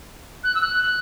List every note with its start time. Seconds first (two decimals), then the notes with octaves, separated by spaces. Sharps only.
0.44 F#6
0.55 E6
0.62 F#6